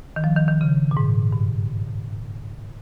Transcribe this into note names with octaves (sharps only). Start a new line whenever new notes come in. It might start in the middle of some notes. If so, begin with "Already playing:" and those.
D#3
F3
D#3
D#3
C#3
A#2
G#2
G2